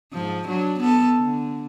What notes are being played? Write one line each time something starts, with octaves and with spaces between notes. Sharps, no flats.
G#2 F3
F#3 D4
B3 A4
D3